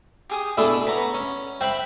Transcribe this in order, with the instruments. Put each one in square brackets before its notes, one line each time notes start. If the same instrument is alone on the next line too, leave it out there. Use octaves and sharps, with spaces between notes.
[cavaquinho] G4 G#4 D#6
[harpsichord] B2 A3 D4 [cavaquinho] E4 G#4 A4
[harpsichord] B3 [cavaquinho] C#5 A#5 B5
[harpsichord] C#4
[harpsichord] C4 E5 B5 [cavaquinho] F#5 G5